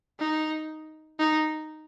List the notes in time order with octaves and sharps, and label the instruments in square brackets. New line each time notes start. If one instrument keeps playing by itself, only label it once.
[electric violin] D#4
D#4